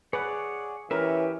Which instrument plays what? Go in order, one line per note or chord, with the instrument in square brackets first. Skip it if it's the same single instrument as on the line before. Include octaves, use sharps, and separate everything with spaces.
[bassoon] G#4 [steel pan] B4 [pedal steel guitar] C#5 D5 F#5
[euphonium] E3 [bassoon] C#4 [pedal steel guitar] G4 B4 E5 [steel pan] A#4